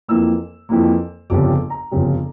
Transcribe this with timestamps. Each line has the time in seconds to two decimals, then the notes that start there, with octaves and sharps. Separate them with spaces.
0.08 F2 E3 A#3 E6
0.69 F2 E3 A#3
1.30 G1 F2 C#3 G3 D6
1.70 A#5
1.91 G1 F2 C#3 G3